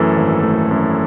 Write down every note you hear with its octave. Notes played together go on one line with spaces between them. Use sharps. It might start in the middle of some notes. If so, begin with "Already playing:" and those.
Already playing: F#2 E3 A3 A4
G#1
A3
F#2